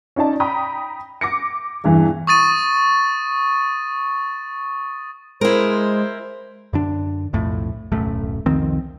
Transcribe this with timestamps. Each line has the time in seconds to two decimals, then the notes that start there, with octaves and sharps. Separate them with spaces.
0.16 C#4 D#4 D5 A5
0.40 G5 A#5 B5 D#6
1.21 D6 A#6 C#7
1.84 E2 G2 E3
2.27 C#6 D#6 A6 D#7
5.41 G#3 E4 A#4 C5
6.73 F#2 D3 D4
7.33 B1 F2 A2
7.92 D1 B1 F#2 A3
8.46 C2 F2 D#3 C4